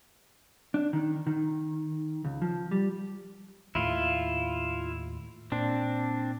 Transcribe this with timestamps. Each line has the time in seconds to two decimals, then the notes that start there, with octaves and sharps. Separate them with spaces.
0.74 D4
0.93 D#3
1.27 D#3
2.24 C#2
2.42 F3
2.71 G3
3.75 D#2 A2 E4 F4
5.52 A#2 C4 D4